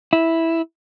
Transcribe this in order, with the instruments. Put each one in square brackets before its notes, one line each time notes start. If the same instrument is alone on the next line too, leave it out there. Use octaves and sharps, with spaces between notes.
[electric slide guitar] E4